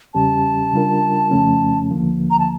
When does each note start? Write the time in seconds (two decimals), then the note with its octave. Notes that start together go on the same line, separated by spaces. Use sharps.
0.14 E2 C#3 G3 C#4 G4 A5
0.73 C#3 G3 D4 F4 A#4
1.31 F2 C#3 F3 A3 C#4
1.91 D2 D3 F3 A#3
2.30 A#5
2.39 A5